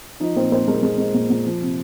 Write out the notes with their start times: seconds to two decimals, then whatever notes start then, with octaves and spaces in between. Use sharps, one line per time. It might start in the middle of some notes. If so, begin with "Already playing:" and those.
0.20 F3 D#4 D#5
0.36 A#2 C4 C5
0.52 A#2 C4 C5
0.67 G#3 A#3 A#4
0.83 G#3
0.98 G#3
1.14 A#2
1.30 A#2
1.46 F3
1.62 C3